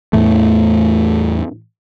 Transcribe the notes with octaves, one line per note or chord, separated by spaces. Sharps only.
E2 A2 E3 A3